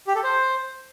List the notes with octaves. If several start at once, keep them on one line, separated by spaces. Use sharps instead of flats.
G4
A4
C5